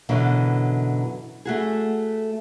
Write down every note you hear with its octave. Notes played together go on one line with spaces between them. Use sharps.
F#2 B2 D3 E3 F#3
A3 F#4 G#4